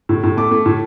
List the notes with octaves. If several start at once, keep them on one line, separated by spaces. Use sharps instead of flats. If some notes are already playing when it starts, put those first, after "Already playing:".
A2
A2
A3 D6
A3
A2